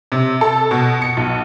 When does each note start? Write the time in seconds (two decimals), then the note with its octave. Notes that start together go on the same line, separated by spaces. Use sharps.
0.12 C3
0.41 A4
0.71 B2
1.02 C#7
1.17 B1